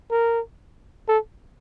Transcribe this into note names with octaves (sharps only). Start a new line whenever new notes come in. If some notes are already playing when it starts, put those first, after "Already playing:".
A#4
A4